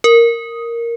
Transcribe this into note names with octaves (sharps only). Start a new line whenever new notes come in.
A#4